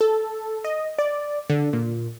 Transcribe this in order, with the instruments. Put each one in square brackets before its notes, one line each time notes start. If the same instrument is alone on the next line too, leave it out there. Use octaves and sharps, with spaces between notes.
[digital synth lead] A4
D#5
D5
D3
A#2